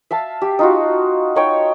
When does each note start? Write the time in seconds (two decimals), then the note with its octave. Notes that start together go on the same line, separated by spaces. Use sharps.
0.11 E5 F5 A5
0.42 G4
0.59 D#4 F4 F#4
1.36 D#4 C#5 G5